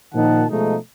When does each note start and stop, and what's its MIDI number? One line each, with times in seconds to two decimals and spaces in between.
0.14 0.45 46
0.14 0.45 51
0.14 0.45 53
0.14 0.45 63
0.14 0.45 78
0.14 0.45 81
0.50 0.76 47
0.50 0.76 53
0.50 0.76 56
0.50 0.76 57
0.50 0.76 63